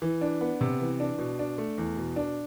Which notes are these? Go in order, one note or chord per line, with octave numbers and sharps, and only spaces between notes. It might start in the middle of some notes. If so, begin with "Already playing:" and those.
E3
D4
B3
C3
E3
D4
B2
D4
A3
E2
B2
D4